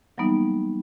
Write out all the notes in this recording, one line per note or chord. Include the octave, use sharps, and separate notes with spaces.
E3 F#3 G3 A#3 B3 D#4